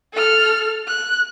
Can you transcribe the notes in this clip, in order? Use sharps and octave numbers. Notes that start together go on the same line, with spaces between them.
A4 F6
F#6